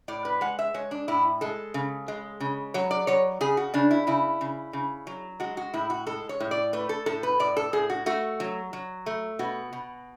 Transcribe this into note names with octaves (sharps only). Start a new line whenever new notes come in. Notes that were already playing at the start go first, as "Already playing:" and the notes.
A2 D5
B4
G#3 F#5
E5
G#3 C#5
D4
A2 E4
G#3 A4
C#3
G#3
C#3
F#3 C#5
D5
F#3 C#5
C#3 G#4
F#4
C#3 D4
E4
C#3 E4
C#3
C#3
F#3
G#3 F#4
F#4
A2 E4
F#4
G#3 A4
C#5
A2
D5
A3 B4
A4
A2 A4
B4
A2 D5
A4
A2 G#4
F#4
A3 F#4
F#3
F#3
A3
B2 F#4
B2